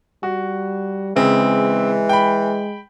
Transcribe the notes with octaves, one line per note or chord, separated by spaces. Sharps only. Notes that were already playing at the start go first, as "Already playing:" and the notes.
G3 F#4
C#3 E3 G#3 C4
G5 B5